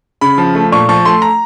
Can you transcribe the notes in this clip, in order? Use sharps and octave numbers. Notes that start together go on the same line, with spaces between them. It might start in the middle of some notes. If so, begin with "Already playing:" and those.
C#3 B5
F3
A3
A#2 C#6
F3 C#6
A3 C6
A#5